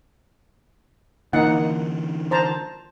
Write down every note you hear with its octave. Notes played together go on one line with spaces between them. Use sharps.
D3 E3 A#3 D#4 F#5
C5 A5 A#5